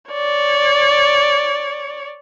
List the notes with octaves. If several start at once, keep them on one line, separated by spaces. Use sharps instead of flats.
C#5 D5